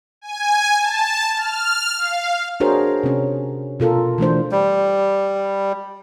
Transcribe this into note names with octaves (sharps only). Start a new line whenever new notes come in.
G#5
A5
F6
F5
D4 F#4 G#4 A#4 C5 C#5
C3 C#4
B2 F4 A4 A#4
E3 A3 D4 C5
G3